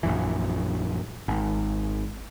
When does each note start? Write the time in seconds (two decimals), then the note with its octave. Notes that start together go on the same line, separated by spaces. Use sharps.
0.03 A#1 F#2 E3
1.28 G#1